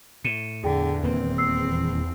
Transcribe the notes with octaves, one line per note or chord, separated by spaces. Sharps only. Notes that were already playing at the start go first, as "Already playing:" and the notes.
A2 C#7 D#7 E7
E2 D3 G#4 G5
D#1 A#3 C4 B4
E6 C7